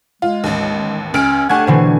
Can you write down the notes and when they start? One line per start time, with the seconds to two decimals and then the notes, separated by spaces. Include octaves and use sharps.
0.22 G#3 F4
0.44 A1 D#2
1.14 C#2 C#4 F6 D7
1.49 A3 D4 G4 F#5 G#5 C#6 G#6
1.67 B2 D3 E3 C5